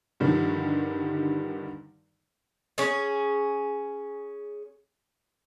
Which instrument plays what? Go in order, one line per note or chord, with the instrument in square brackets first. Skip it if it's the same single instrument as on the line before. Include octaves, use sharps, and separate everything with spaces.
[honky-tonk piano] G2 D3 D#3 F3
[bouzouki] C#4 G#4